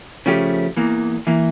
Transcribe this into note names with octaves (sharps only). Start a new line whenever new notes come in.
C#3 F3 A3 C#4 G4
E2 E3 A#3
E3 A#3